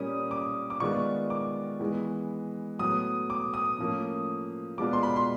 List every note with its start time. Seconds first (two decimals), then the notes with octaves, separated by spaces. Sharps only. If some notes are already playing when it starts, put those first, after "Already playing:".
Already playing: A#2 G3 A#3 C#4 D#6
0.31 D6
0.70 D6
0.80 D#3 G#3 B3 D4 F4 C#6
1.30 D6
1.80 E3 G#3 B3
2.79 A2 F#3 B3 D#6
3.30 D6
3.54 D#6
3.78 A2 F3 A#3 C#4
4.78 B2 G#3 B3 D4 F4 D6
4.93 C6
5.03 B5
5.16 C6